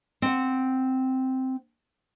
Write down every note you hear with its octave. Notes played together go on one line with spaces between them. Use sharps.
C4 F#5